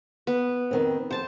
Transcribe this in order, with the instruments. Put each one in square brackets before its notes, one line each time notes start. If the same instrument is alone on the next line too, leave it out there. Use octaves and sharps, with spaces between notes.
[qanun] B3
[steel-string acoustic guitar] F2 D#3 C4
[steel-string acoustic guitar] F2 G#2 [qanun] C5 A5